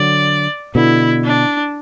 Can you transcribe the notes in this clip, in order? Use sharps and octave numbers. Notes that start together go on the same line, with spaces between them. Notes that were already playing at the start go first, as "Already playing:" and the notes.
Already playing: D3 F#3 D5
B2 D3 E4
D4